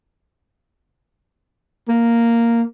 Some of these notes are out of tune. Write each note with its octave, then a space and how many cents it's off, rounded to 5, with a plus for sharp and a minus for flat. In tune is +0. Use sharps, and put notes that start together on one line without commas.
A#3 -5